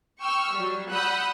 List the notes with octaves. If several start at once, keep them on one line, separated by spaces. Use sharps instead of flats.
G5 C#6 E6 F6
F#3 G3
F#5 B5 D#6 E6 F#6 G6